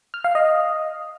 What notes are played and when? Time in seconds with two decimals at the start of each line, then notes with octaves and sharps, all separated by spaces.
0.14 F6
0.24 F5
0.35 D#5